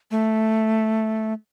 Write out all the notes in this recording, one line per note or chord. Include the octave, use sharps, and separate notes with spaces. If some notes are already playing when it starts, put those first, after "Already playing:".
A3